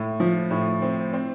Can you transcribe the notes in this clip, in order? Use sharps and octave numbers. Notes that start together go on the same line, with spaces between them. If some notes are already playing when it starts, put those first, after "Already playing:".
Already playing: A2
F3
A2
C4
C4